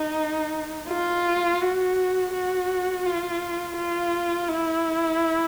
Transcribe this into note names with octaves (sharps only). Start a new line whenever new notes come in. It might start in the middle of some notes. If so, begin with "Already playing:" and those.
Already playing: D#4
F4
F#4
F#4
F4
F4
E4